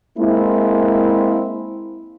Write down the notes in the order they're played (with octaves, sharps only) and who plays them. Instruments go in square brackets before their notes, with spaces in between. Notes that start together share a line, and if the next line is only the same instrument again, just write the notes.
[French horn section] G#3 A#3 C4 E4